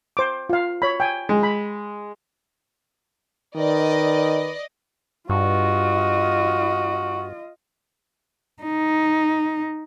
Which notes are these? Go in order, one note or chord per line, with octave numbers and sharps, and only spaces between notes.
C5 D6
F4 F5
C#5 B5
G5 G#5
G#3
B5
D#3 B4 D5 D#5
G2 F4 F#4 D#5
D#4